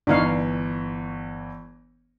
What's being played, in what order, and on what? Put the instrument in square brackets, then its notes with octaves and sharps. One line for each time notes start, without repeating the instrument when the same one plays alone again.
[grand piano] G1 E3 C#6 [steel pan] D4 D#4 F5